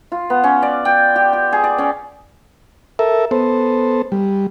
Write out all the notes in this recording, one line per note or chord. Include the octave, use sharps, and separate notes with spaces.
F4
B3
C#4
D5
G5
G4
G4
G#4
D5
C#4
A4 A#4 E5
B3 A4 C5
G3